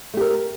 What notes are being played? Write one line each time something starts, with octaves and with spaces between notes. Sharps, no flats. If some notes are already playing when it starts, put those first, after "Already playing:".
A3 G4 A#4